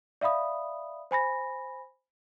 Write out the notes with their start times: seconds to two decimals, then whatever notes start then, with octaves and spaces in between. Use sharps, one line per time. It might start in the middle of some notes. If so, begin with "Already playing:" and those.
0.21 D5 E5 F5 B5 D#6
1.11 C5 G#5 B5 A#6